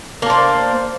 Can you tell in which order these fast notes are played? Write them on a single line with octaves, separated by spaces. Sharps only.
A#3 D4 C5